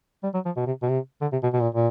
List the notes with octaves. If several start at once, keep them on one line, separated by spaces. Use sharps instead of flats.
G3
F#3
F3
B2
C3
B2
C3
D3
C3
B2
B2
A#2
A#2